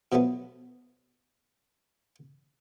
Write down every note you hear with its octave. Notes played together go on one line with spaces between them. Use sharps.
B2 F3 F#3 A3 B3